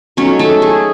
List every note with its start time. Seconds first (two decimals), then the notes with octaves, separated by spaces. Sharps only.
0.17 F#3 A3 C#4 D#4 C#5
0.39 A3 A4
0.62 G#4